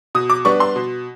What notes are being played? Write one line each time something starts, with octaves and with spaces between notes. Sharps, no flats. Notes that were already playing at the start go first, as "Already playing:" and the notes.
B2 D#6
D6
G3 B3 D4 C#6
C6
B2